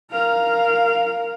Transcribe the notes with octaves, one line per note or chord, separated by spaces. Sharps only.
A#4 F5